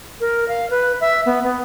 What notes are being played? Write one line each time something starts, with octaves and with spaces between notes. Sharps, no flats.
A#4
F5
B4
E5
B3
B3